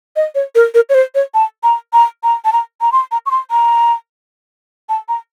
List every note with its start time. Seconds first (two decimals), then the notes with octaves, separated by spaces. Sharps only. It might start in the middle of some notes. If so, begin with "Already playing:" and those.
0.16 D#5
0.35 C#5
0.55 A#4
0.74 A#4
0.89 C#5
0.94 C5
1.15 C#5
1.34 A5
1.63 A#5
1.93 A#5
2.23 A#5
2.45 A5
2.53 A#5
2.81 A#5
2.92 C6
3.12 A#5
3.26 C#6
3.31 C6
3.51 A#5
4.89 A5
5.08 A#5